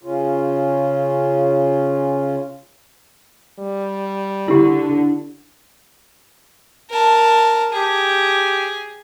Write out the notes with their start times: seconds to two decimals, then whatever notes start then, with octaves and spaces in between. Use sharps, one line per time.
0.03 C#3 C#4 F4
3.59 G3
4.48 D3 E4 G4
6.90 A#4 A5
7.73 G4 G#4